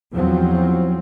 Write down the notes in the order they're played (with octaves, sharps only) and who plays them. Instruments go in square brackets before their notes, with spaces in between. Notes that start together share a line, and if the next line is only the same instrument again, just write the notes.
[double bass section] E2 F3 F#3 C4